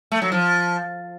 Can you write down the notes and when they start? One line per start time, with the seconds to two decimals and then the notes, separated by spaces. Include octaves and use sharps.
0.12 A3
0.22 F#3
0.32 F3